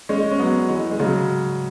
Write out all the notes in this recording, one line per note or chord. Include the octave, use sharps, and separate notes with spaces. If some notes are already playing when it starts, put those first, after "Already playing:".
G#3 C#4
C#4
F#3 B3
E3 G#3
G#3
C#3 F#3